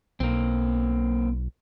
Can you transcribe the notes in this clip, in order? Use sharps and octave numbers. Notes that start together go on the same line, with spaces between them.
B1 A#3 C4